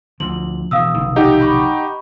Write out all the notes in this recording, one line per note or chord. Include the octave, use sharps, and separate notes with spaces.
D2 F3 F#7
B2 E3 F5 D#6 E6
F1 B1 D#3
D#4 G4 F#5
B5 C#6